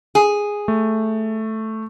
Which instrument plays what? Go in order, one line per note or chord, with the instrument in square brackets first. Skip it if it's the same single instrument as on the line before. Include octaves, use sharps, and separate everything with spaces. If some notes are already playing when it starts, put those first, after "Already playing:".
[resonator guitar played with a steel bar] G#4
[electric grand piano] A3